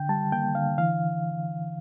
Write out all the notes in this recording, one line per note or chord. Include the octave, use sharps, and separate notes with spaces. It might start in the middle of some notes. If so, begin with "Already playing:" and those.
Already playing: D3 G5
G3 A5
A#3 G5
D3 F5
E3 F5